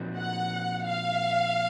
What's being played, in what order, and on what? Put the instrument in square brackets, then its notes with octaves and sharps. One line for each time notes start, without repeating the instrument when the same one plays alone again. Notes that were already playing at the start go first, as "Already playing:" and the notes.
Already playing: [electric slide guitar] A#2 F3 C4 D#4 F#4
[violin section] F#5
F5